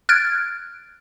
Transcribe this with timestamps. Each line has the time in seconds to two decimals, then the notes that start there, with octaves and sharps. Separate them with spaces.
0.09 F6 F#6 G#6 A6 D7